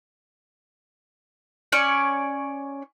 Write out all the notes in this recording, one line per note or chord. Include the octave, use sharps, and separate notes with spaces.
C#4 C#5 D5 C#6